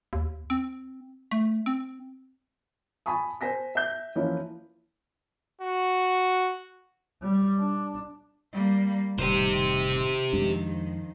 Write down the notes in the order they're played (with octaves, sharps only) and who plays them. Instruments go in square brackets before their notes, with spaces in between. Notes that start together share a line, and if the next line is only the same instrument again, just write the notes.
[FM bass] D#2
C4
A3
C4
[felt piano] G#5 A5 B5 C#6 D#6
C5 G#5 A#6 B6
E5 G6
E3 F3 A#3 C#4 E4
[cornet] F#4
[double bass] G3
D4
[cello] G3 A#3
[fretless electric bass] F1 A2 G3 [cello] D#3 [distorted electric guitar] G4 C5
[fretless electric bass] F2 G#3 D4 [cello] D#3 F3